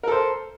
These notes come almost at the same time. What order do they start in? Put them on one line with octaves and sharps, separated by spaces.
A#4 A4 C5